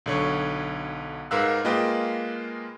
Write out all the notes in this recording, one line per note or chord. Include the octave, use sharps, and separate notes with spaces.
B1 D3 C#5
G#2 A#4 B4 F5 E6 F#6
G#3 A#3 F4 B4 D#5 G5